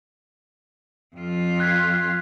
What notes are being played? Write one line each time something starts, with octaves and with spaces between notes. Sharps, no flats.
F2 F4
F#6 G#6 B6